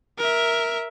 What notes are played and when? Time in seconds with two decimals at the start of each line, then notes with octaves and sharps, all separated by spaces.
0.18 A#4 E5